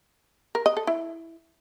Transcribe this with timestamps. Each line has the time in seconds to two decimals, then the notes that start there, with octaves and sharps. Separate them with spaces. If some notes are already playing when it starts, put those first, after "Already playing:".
0.55 A#4
0.66 D#5
0.77 A4
0.87 E4